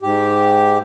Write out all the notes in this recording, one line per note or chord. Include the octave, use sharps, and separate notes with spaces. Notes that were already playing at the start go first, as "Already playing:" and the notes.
G#2 G4